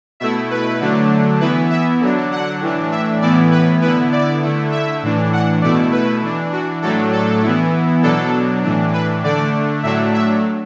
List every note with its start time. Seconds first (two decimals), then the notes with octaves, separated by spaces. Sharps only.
0.20 B2 A3 E4 E5
0.51 B4
0.80 D3 F#3 A3 D4
1.40 E3 B3 E4 B4
1.70 E5
2.00 D3 F#3 D4
2.32 F#5
2.61 A2 E3 D4
2.91 E5
3.21 A2 E3 B3 E4 D5
3.51 B4
3.81 D3 B3 E4 B4
4.12 D5
4.42 D3 A3 E4
4.72 E5
5.02 A2 E3 D4
5.33 F#5
5.62 B2 A3 E4 D5
5.92 B4
6.22 E3 D4
6.52 F#4
6.82 A2 F#3 A3 D4 A4
7.12 A4
7.42 E3 B3 E4
8.03 B2 F#3 D4 A4
8.64 A2 E3 D4
8.93 B4
9.23 D3 A3 D4 D5
9.83 A2 F#3 A3 D4 E5
10.14 E5